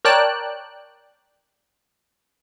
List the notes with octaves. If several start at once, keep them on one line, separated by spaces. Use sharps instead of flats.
A#4 C#5 D5 G5 A5 F#6